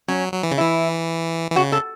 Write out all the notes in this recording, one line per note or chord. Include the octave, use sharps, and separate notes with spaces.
F#3 C#4
F#3
E3
C#3
E3 E4
E3
C#3 F#4
A4